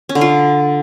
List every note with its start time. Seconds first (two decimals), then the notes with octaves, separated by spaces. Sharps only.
0.09 C#4
0.15 D3
0.21 F4